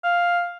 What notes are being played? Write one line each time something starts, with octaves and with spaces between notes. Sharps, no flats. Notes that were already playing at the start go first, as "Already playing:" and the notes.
F5